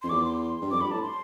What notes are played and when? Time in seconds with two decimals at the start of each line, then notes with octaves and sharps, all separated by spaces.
0.02 F2 C6
0.10 E2 D6
0.26 C6
0.62 G2
0.71 F2 D6
0.81 G2 B5
0.91 A2 A5
1.02 C6